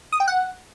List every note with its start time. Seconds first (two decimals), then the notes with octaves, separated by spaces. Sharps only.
0.12 D#6
0.20 G5
0.28 F#5